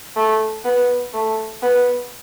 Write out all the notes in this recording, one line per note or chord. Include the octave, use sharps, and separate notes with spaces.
A3
B3
A3
B3